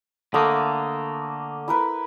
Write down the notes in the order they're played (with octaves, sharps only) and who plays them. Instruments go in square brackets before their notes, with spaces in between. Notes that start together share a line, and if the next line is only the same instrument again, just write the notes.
[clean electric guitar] D3 A#3 [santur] A3 D#6 E6
[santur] E4 A#4 B4